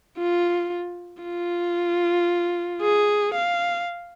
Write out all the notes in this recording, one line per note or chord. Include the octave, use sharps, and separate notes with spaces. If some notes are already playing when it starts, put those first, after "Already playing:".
F4
F4
G#4
F5